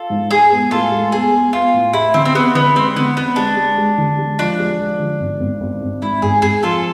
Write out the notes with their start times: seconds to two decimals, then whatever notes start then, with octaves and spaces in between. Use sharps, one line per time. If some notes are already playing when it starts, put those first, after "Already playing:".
Already playing: F4 A4
0.10 G#2
0.30 G#3 G#4
0.51 B3
0.71 A2 F4 A4
0.92 G#3
1.12 B3 G#4
1.33 B3
1.53 B3 F4
1.74 A2
1.93 E4 G#4
2.14 D3 C4
2.25 C4
2.35 B3 G#4
2.55 D3 B3
2.75 G#3 C4
2.96 D3 B3
3.17 B3 C4
3.36 G#3 D4
3.57 G#3
3.78 G#3
3.98 D3
4.18 G#3
4.39 F3 D4
4.59 G#3
4.79 F3
5.00 D3
5.20 G#1
5.40 G#1
5.61 G#1
5.81 G#1
6.02 G#2 E4
6.22 G#1 G#4
6.42 G#1 G#4
6.63 F3 F4 A4